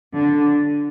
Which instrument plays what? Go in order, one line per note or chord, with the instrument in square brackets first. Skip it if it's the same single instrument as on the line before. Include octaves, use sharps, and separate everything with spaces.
[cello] D3